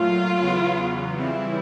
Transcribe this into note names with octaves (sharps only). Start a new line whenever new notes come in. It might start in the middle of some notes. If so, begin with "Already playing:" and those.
Already playing: A#2 F#3 A3 F4
E2 C#3 F#3 B3
C#3 E3 G3 C4 E4